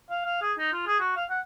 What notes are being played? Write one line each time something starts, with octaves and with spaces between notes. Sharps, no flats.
F5
F5
G#4
D#4
F4
G#4
F#4
F5
F#5